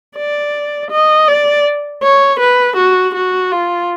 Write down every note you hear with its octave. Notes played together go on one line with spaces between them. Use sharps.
D5
D#5
D5
C#5
B4
F#4
F#4
F4